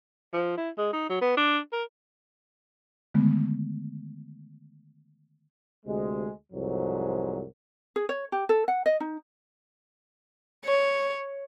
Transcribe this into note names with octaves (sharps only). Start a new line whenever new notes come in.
F3
E4
G#3
D#4
F#3
B3
D4
A#4
D3 D#3 G#3 A3 B3
D2 C3 G#3
C2 F2 G#2 F3 F#3
G#4
C#5
G4
A4
F#5
D#5
D#4
C#5